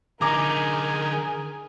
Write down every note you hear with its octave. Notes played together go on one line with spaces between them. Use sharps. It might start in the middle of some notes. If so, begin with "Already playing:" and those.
D3 D#4 G#4 A#4 G#5 A#5 D6